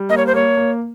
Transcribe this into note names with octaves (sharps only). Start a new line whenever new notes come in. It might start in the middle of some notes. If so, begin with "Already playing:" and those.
Already playing: G3
A#3 D#5
C#5
C5
A#3 C#5
A#3